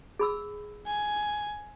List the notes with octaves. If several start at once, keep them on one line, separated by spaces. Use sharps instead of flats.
G#4 B5 E6
G#5